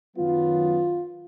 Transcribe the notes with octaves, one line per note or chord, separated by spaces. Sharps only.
F#2 D#3 F#3 B3 F4